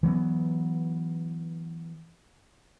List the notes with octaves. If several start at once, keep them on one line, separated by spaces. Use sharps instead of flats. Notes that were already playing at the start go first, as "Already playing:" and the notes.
E3 F#3 A3 B3